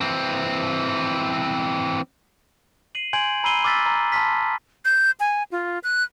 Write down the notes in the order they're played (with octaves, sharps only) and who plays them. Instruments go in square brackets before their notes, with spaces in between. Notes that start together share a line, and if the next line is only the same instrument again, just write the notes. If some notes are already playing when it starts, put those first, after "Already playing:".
[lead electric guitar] E3 C4
[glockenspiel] C7 D#7 F#7
G#5 C6 G6 G#6 D7 F#7
A#5 B5 E6 C7 D#7 G7
C6 D6 E6 F6 A6 B6
A#5
A5 C6 D6 F6 B6
[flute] G6
G#5
F4
F#6